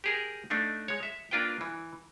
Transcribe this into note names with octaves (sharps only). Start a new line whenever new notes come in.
G4 G#4 A#4
A3 D4 D#4
G#3 C#5
E5
A#3 D4 F4 B4 G5
E3